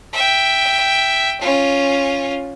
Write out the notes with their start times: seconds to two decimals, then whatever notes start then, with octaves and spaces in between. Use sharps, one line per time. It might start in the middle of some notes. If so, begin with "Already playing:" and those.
0.13 E5 G5
1.41 C#4 F4